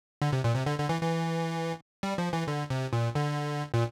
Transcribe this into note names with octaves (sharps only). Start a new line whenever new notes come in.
D3
C3
A#2
C3
D3
D3
E3
E3
G3
F3
E3
D3
C3
A#2
D3
A#2